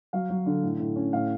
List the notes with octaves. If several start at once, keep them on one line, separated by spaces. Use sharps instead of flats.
F#3 F5
F#3
D3
A2
A2
C#4
A2 F5